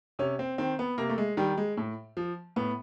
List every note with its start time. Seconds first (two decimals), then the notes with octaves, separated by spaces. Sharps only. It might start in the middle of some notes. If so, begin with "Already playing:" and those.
0.19 C3 C#4
0.39 C4
0.58 D#3 C4
0.79 B3
0.98 C3 A#3
1.10 A3
1.18 G#3
1.37 D#3 G3
1.58 G#3
1.77 A2
2.17 F3
2.56 A2 B3